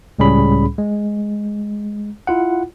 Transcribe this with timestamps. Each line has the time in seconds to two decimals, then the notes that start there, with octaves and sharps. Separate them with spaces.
0.19 C#2 A2 G3 C#4 G#4 B5
0.78 G#3
2.27 E4 F4 F#5